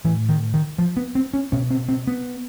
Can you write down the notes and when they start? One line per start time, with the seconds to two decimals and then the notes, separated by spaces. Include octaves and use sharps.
0.04 A2 E3
0.29 D#3
0.54 D#3
0.79 F3
0.97 B3
1.15 C4
1.34 C#4
1.52 B2 C#4
1.70 C4
1.89 C4
2.07 B3